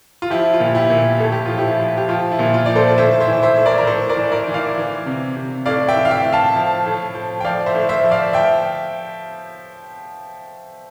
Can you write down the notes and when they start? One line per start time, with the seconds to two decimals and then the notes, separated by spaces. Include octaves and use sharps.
0.22 F4
0.30 F3 E4 G4
0.54 F4
0.60 A#2
0.75 E4 G4
0.90 A#2
1.20 A2 A4
1.32 G4
1.46 F3 F4
1.58 E4 G4
1.80 F3
1.97 G4
2.09 F3 F4
2.32 E4
2.39 A#2
2.54 F4
2.66 F3 D5
2.76 A4 C5
2.98 A2 C5 E5
3.20 C5 E5
3.28 E3
3.43 C5 E5
3.57 A2
3.66 A#4 D5
3.78 A#4
3.87 A2 A4 C5
4.09 A#4 D5
4.17 E3
4.32 A#4 D5
4.48 E3
4.54 D5 F5
4.78 E3
5.06 C3
5.36 C3
5.66 A2 D5 F5
5.89 E5 G5
5.96 E3
6.05 F5
6.10 E5 G5
6.25 A2
6.33 F5 A5
6.56 F3
6.86 A2
7.14 F3
7.40 G5
7.45 F3 D5 F5
7.66 C5 E5
7.75 A2
7.89 C5 E5
8.04 F3
8.11 D5 F5
8.33 F3 E5 G5